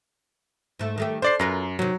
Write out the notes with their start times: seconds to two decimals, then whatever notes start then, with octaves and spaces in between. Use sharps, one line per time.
0.79 G#2 A3
0.98 D#3 A3 G4
1.22 D4 C5 D5 C7
1.39 F#2 F4 A#4 B4
1.79 C3 D#3 F#3